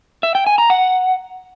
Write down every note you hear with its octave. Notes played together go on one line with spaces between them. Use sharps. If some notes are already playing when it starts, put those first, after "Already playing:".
E5
G5
G#5
A#5
F#5